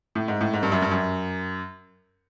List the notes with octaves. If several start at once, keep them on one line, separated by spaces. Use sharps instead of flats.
A2
G#2
A2
G#2
G2
F#2
G2
F#2